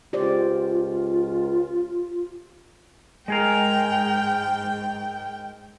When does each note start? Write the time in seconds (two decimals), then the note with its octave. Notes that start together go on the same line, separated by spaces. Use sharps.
0.13 C#2 F4 G4 C5 D5
3.28 G#2 G#3 G#4 A#4 G5